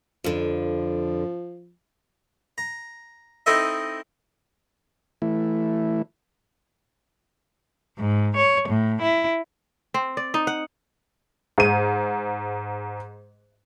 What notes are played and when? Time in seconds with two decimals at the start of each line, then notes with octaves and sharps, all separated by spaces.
0.24 F2 D3 F3
2.58 A#5
3.46 C4 D#4 E4 A4 D#5 E5
5.22 E3 A3 E4
7.97 G#2
8.36 C#5
8.69 A2
8.99 E4
9.94 C4
10.17 D5
10.34 D#4
10.47 F#5
11.58 G#2 D#7